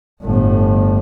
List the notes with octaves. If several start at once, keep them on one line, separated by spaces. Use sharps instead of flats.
G1 A2